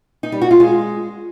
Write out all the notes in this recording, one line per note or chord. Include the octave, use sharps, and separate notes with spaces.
D#4
G3
F#4
F4
G#3